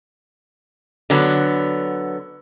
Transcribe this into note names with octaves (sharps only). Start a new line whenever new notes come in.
D3 F#3 B3